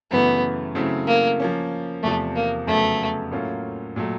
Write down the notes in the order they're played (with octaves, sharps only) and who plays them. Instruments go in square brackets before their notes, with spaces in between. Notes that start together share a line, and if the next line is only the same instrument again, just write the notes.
[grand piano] F#2 C#3 E3 A3 [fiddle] B3
[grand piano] C#3 F#3 A3 C4 E4
[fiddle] A#3
[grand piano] F3 A#3 C#4
[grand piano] E2 C3 F3 [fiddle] A3
[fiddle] A#3
[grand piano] F2 C#3 F#3 B3 [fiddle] A3
[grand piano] A2 F#3 A#3 C#4 F4
A#2 F#3 A3